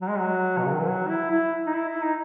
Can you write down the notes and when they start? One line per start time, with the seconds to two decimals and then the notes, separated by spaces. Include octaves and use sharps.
0.01 F#3
0.09 G#3
0.19 F#3
0.58 B2
0.65 C#3
0.73 D#3
0.80 E3
0.88 F#3
1.09 E4
1.30 E4
1.67 D#4
1.74 E4
1.88 E4
2.03 D#4